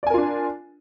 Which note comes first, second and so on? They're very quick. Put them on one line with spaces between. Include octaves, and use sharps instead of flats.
D5 G#5 A#4 F4 D4